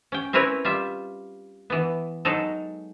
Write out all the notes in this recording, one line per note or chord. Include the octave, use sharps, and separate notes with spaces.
C#4 G5
C4 C#4 E4 A#4 B4 C#5
G3 F4 E5
E3 B3
F#3 G#3 D#4 A4